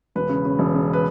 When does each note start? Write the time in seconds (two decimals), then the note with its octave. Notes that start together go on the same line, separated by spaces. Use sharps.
0.15 E1 B4
0.29 C#3
0.45 C#3
0.59 E1
0.75 C#3
0.93 B4